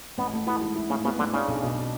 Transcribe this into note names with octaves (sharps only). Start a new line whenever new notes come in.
A1 B3
A3
E3 B3
G#2
E4
A2 C#3
C#3 B3
A2 D3
C#3 D4
B1
B2